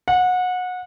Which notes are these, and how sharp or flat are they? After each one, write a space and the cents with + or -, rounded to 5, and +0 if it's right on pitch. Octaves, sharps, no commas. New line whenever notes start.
F#5 -25